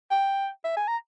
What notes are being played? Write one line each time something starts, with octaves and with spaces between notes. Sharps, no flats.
G5
E5
G#5
A#5